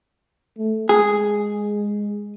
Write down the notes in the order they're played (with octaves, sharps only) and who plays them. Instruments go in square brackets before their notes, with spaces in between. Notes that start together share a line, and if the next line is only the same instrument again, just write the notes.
[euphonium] A3
[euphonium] G#3 [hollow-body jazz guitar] G#4